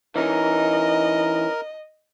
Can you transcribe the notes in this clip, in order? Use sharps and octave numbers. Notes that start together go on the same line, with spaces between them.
E3 C#4 D#4 A#4 D#5